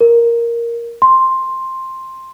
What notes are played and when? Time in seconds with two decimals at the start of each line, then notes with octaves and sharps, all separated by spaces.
0.01 A#4
1.02 C6